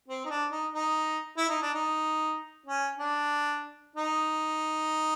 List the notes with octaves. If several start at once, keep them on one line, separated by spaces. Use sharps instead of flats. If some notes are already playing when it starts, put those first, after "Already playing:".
C4
D#4
D4
D#4
D#4
E4
D#4
D4
D#4
C#4
D4
D#4